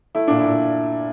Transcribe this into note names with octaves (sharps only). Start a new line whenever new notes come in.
A3 E4
A#2 D4
E4
A#2